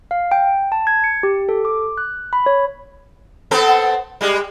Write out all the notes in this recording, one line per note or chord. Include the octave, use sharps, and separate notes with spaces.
F5
G5
A5
G#6
C#7
G4
A4
D6
F#6
B5
C#5
B3 C4 A4
G3 G#3